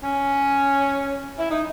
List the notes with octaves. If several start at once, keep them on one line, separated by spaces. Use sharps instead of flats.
C#4
E4
D#4